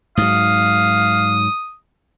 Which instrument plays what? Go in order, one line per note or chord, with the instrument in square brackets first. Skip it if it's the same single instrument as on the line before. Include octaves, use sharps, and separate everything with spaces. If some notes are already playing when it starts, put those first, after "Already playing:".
[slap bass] G#2 F#3 [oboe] F5 [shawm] D#6